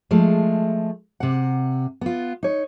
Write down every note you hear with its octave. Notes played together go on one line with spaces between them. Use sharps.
F3 G#3 A3
C3 F#5
B3 F4
D#4 C#5